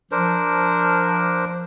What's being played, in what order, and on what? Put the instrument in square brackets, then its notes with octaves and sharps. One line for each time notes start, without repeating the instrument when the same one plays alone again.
[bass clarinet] F3 [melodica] D4 A#4 C5